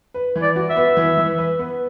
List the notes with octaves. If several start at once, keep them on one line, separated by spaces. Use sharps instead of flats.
B4
E3
D5
F#4
E5
B3
E3
E3
B4
B3